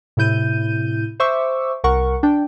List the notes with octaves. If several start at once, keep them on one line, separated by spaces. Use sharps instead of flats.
A2 C3 E4 G6 D#7
C5 E5 C#6 D6 E6
C2 A#4 F#5 C#6
D4 G5